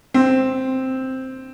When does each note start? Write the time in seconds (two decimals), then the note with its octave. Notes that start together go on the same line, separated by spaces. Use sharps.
0.14 C4